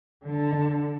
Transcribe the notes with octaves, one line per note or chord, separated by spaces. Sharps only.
D3